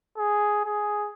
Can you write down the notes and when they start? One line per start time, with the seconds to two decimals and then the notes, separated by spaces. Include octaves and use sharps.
0.17 G#4
0.65 G#4